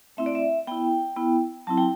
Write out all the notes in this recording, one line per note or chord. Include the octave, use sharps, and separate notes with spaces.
A3 C4 E4 E5
D5
E5
B3 E4 G5
B3 E4
F#3 C4 E4 A5
G5